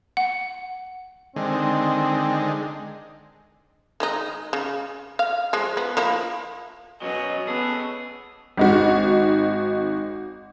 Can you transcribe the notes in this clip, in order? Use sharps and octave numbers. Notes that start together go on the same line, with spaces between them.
F#5
D3 D#3 G#3 C4
D#3 G#3 D#4
C#3
F5
F3 G#3
B3
F3 A#3 E4
B2 F#3 C#4 D#5
B3 C#4 G#4 A4
G#1 D#4 F#4